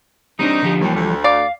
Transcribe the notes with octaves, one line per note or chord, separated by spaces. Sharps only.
G3 C4 D4 D#4
D3 F3 G4
D#2 E3 F3 G3
D2
D5 F5